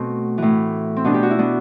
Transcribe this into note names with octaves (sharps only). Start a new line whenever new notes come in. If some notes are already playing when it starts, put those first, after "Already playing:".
Already playing: B2 A3 C4
A2 E3
C4
B2 B3 D4
G4
F#4
E4
B3 D4